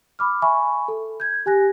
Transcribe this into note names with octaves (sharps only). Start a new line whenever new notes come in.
B5 D6 F6
E5 G#5 B5 C#6
A4
G6 G#6
G4 G#5 F#6 A#6